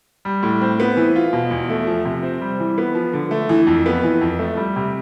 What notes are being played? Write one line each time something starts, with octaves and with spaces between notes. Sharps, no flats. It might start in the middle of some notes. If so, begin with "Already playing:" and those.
G3
A2
C4
B3
E3
F4
B2
E2
A3
F3
C3
C4
G3
E3
B3
F3
D3
A3
E3
F2
B3
E3
F2
A3
G3
C3